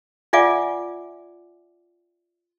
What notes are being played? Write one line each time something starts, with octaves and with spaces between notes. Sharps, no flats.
F4 D5 E5 F#5 G#5 D6